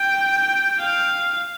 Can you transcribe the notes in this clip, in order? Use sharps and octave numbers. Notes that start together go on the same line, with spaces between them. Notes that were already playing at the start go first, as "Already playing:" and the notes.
Already playing: G5
F5